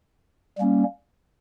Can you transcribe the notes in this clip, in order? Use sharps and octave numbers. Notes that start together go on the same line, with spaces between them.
G3 A#3 C#4